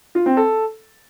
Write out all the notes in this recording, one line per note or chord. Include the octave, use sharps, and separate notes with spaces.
F4
C4
A4